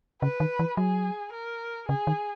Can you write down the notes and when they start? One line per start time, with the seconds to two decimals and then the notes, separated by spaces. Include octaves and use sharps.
0.22 C#3 B4
0.40 D#3
0.59 E3
0.77 F#3 G#4
1.33 A#4
1.89 C#3 G#4
2.07 D#3